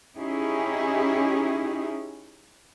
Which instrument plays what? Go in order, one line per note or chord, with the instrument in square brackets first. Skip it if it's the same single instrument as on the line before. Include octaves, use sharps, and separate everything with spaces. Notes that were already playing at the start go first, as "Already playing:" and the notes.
[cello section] C#4 D#4 E4 G4 G#4